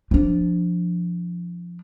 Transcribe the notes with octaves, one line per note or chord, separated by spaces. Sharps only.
F3 D4